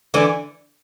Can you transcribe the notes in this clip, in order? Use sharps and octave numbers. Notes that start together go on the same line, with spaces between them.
D3 E3